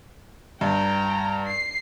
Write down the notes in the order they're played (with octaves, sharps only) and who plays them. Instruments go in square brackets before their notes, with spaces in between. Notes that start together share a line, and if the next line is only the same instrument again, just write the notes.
[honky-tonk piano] G2 [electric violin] G5 A#5
[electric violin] C7